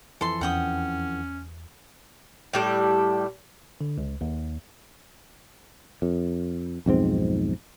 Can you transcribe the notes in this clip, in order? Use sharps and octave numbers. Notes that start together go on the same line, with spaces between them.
F2 E3 A4 C6
E2 C#4 F#5 G5 D#6
A2 G3 A4
D3
C#2
D#2
F2
B1 F2 G#2 C4